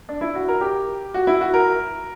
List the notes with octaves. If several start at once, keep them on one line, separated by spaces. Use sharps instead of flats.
D4
E4
F#4
A#4
G4
F#4
E4
F#4
A#4